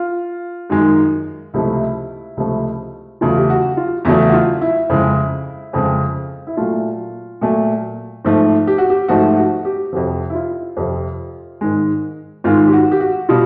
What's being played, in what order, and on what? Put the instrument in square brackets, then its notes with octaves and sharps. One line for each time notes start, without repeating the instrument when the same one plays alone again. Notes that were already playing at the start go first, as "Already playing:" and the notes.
Already playing: [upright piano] F4
F#2 D#3 G#3
C#2 C3 F3 A3 E4
C#2 C3 F3 A3
E2 C#3 F#3 A3 F4
G4
F#4
F4
E2 C#3 F#3 A3 E4
F#4
F4
E4
F2 C#3 F3 G#3 E4
F2 C#3 F3 G#3
E4
A#2 F#3 A3 F4
A#2 F#3 A3
G#2 F3 A3
G4
F#4
G4
G#2 F3 A3 F#4
F#4
G4
F2 C3 F3 F#4
E4
F4
F2 C3 F3
G#2 D#3 G#3
G#2 D#3 G#3 F4
G4
F#4
G4
F#4
B2 G3 F4